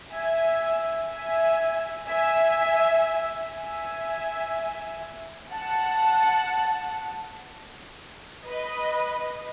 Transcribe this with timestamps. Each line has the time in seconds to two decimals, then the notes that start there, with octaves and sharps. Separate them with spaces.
0.12 E5 G#5
1.10 E5 G#5
2.08 E5 G#5
3.55 E5 G#5
5.51 F#5 A5
8.46 B4 D#5